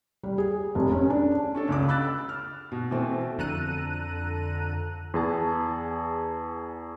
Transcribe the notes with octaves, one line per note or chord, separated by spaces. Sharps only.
G3
G#4
F1
C#4
D4
C#4 D4 A4
C#2 C#3 D6
B5 E6 F#6 A6
F6
B2
B2 E3 A3 C4
F2 D3 A4 A#5 F#6 D#7
E2 G#4 A5